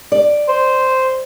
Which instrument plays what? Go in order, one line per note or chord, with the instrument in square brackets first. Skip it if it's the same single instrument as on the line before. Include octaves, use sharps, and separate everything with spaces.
[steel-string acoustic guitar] D5
[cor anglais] C5